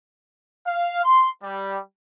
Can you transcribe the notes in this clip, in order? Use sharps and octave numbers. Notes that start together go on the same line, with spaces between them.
F5
C6
G3